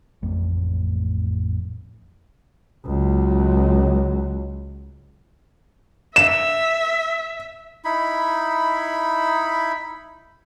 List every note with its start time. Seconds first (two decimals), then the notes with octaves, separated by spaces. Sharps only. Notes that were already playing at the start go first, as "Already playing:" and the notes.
0.23 A1 F2 A2
2.85 C#2 F#3
6.16 E5 E7
7.85 D#4 E4 B5